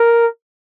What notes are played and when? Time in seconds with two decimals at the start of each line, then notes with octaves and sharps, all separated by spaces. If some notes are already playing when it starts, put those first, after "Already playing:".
Already playing: A#4